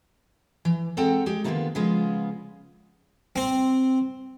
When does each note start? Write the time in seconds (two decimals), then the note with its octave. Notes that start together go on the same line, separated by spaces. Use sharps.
0.65 E3
0.97 G#3 C4 A4 F#5 G5 A#5
1.26 G#3 G4
1.44 D3 D#3 A#3 B3 D#4 F4
1.75 C#3 F3 G#3 B3 F4
3.36 C4